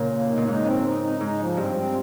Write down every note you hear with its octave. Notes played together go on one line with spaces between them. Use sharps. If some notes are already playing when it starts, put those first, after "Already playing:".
Already playing: A#2 C#3
A#3
D#4
A#2
G#2 D#4
C4
D#4
D#4
G#2 D#4
F3
G2 C4
C4